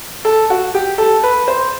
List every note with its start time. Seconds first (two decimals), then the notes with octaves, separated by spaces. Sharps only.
0.25 A4
0.50 F#4
0.75 G4
0.98 A4
1.23 B4
1.48 C5